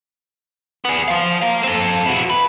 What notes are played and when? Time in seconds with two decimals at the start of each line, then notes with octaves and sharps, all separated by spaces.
0.85 B3 G#4
1.08 C5 F5
1.42 A#4 F5
1.64 C4 A4
2.06 E4 F#4
2.30 B4